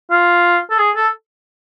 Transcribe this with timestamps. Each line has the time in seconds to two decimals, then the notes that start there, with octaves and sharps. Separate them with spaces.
0.11 F4
0.71 A4
0.79 G#4
0.96 A4